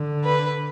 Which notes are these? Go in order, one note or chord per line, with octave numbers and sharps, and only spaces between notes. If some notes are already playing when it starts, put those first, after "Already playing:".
Already playing: D3
B4